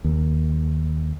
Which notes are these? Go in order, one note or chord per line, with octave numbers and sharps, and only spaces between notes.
D#2